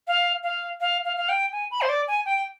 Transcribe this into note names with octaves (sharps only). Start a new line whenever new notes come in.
F5
F5
F5
F5
F5
G5
G#5
B5
C5
D5
G#5
G5